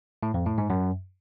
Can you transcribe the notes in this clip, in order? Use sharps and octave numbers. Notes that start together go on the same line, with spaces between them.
A2
F2
A2
G#2
F#2